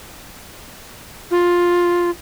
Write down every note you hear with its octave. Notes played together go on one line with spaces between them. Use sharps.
F4